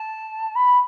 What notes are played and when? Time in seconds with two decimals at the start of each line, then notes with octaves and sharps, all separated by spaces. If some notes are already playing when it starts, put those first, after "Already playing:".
Already playing: A5
0.55 B5